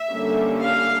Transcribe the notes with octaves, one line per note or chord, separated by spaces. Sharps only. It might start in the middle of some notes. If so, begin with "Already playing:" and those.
Already playing: E5
D3 G3 A#3 C#4
F5